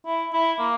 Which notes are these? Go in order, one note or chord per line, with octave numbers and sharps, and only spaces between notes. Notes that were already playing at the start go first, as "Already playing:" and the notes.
E4
E4
A#3